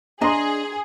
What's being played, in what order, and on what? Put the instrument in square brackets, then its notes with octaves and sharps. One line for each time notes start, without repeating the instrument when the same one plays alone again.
[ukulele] D4 D#5 [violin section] G#4 [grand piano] A#5 C6